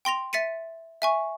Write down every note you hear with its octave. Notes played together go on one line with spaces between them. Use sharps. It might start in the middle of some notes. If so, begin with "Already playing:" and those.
G5 C6 A#6 F7
E5 A6 B6 C#7 D#7
E5 G#5 C#6